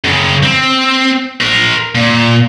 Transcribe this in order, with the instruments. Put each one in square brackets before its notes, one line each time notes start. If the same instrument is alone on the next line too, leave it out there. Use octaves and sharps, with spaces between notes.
[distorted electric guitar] F#2 C#3
C4
A#4 C5
A#2